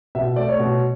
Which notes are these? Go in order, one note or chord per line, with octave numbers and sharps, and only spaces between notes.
B2 E5
A3 D5
C#5
B2